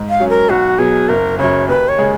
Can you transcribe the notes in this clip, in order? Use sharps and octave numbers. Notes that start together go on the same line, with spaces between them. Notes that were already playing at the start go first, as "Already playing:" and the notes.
Already playing: G#2
F5
F#3 C#4
A#4
B1 F#4
B2 F#3 G#4
F#1 A#4
F#2 C#3 C#5
D#2 B4
C#5
C#3 G#3 C#4 G#4